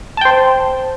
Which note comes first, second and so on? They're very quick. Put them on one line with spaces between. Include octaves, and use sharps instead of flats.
A5 G5 C5